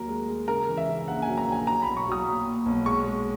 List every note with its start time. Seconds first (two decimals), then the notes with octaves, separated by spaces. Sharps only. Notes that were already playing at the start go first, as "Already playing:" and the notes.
Already playing: D#2 F#3 A#4
0.09 G#3
0.29 G#3
0.48 C#3 A#4
0.68 E3
0.77 E5
0.88 C#3
1.08 A#1 F#5
1.22 G#5
1.27 F#3
1.37 A#5
1.47 A#1 G#5
1.67 F#3 A#5
1.82 B1 B5
1.97 C#6
2.07 F#3 D#6
2.26 A#2
2.46 A#2
2.66 B1
2.86 G#3 C#6
3.06 G#3